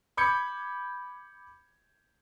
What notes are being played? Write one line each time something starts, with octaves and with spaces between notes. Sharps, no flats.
B5 D6 G6 G#6 C#7